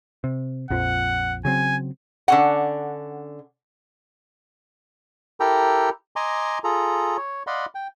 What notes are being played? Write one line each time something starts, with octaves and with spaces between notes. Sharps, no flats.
C3
A#1 F2 F3 F#5
C#3 F#3 C4 G#5
D3 C#4 F#5
E4 G4 A4 A#4 G5 A#5
D#5 G#5 A#5 C6 D6
F4 G#4 A4 A#5
C#5
D5 D#5 F5 F#5 B5 C6
G5